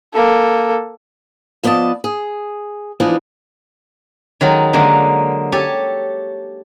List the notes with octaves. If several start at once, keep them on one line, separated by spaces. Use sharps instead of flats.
A#3 A4
F3 B3 D5 D#5 A5
G#4
E3 F3 G#3 B3 D4 D#4
D#3 F#3 G#3 A4
D3 F#3 G#3 A#3
G4 A4 C#5 G#5